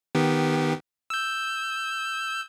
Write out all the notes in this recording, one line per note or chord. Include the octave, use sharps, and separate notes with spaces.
D#3 B3 G4
E6 G6